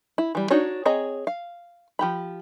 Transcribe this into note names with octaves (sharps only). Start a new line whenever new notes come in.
E4
E3 G3
D4 D#4 F#4 C#5
C4 G#4 C#5 D#5 A#5
F5
F3 G4 B5